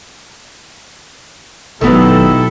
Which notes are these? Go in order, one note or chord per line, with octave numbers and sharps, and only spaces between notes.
G#1 B2 D#3 F#3 B3 E4 G4 A4